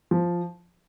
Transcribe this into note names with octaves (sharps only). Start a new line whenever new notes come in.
F3